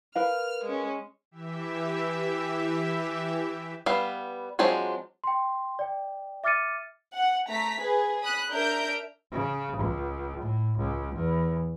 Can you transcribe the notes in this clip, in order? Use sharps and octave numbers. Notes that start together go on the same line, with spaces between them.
A#4 B4 F5 F6
G#3 C#4
E3 G4 E5
G3 B3 B4 E5 F5
F3 F#3 G#3 C4 D4
G5 C6
D5 G5
E5 D6 F6 A6 C#7 D#7
F#5
A3 A#5 B6
G#4 B4
B5 D#6 F#6
D4 A#4 E5 A#5 G6 D7
C#3
C#2
A2
C#2
E2